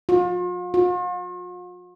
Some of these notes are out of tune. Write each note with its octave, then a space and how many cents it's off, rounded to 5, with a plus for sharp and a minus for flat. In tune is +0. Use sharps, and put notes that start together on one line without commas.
F4 +40
F4 +45